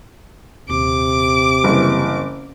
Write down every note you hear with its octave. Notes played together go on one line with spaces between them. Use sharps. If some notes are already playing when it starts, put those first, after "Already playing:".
D#1 C3 D6
F#1 E3 G3 C4